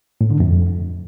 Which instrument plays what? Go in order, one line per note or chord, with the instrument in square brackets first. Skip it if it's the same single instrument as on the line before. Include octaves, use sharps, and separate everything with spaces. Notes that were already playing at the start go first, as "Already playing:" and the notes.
[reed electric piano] A2
D3
F2